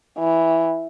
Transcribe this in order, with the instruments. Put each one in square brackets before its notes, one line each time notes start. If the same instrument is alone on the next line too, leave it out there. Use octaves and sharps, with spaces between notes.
[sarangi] E3